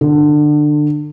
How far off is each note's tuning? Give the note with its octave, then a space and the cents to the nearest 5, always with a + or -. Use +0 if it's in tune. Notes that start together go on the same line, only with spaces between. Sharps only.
D3 +25